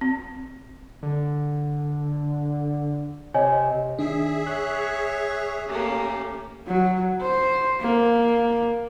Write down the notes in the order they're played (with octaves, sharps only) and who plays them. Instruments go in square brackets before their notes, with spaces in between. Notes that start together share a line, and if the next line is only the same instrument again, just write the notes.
[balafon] C4
[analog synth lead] D3
[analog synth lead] C3 [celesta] C#5 D#5 G#5
[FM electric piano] D#3 D4 [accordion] G#4 E5
[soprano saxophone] C#5 [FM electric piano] F#6
[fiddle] A3 A#3 [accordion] C#4 G4
[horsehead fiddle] F#3
C5
A#3